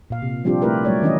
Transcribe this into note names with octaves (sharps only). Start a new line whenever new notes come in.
A#2 F5
C3
F3 G3 C4 D4 F4 G4
A3 E4 F4 G4 A#4 B4
F#3 G3 A3 C#5 D5
D#3 E3 C#4 D#4 E4 D#5